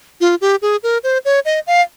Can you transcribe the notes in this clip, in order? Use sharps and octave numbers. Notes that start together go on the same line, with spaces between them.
F4
G4
G#4
A#4
C5
C#5
D#5
F5